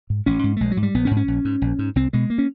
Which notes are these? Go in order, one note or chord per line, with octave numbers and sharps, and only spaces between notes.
G#2
A1 C#4
G#2
A3
A#1 G#3
F#3
G#2
G3
A#1 B3
C#4
G#2
C#4
A#1
G#2
A#1
G#2
C2 C4
B2 G#3
A#3
C#4